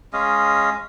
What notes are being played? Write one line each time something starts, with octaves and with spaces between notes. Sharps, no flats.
G#3 C#4 D#5 F5